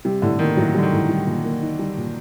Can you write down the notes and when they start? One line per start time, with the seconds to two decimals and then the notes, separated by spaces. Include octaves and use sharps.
0.05 C3 G3
0.22 A2 D3
0.39 D#3 A#3
0.57 A2 F#3
0.75 D3 G3
0.83 D#3
0.92 A2
1.09 G3
1.27 A#2
1.44 A#3
1.62 D#4
1.79 G3
1.97 A#2